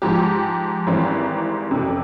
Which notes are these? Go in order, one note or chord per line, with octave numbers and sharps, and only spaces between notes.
G#2 F3 G#3 G4
G#1 G#2 E3 G3 C4
F1 F2 C3